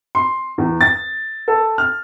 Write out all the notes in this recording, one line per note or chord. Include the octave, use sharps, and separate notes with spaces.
C6
E2
A6
A4
F6